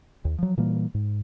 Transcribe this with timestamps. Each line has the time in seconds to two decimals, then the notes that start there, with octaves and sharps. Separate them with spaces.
0.25 D#2
0.38 F3 F#3
0.57 A#2 E3 G3 A#3
0.94 G#2